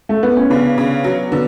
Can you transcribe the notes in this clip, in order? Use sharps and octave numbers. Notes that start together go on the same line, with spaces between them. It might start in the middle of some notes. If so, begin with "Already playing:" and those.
A3
B3
C#4
C#3 B3 D4
C#3
F#3
D3 B3 D4